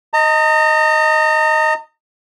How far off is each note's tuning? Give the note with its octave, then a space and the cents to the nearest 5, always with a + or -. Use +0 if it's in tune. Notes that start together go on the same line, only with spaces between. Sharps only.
D#5 +0 A#5 -40